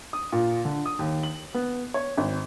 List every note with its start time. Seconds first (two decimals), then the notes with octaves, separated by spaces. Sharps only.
0.13 D#6
0.32 A#2
0.65 D3
0.86 D#6
0.99 D#2
1.23 F#7
1.54 B3
1.94 C#5
2.17 G#1